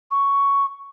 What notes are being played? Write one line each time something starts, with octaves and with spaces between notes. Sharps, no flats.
C#6